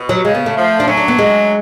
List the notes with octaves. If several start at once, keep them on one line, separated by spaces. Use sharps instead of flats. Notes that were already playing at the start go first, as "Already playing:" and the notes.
Already playing: B2
F#3
C#3 G#3
B3
A3
F3
D4
F#3 C#4
D4
B3
G#3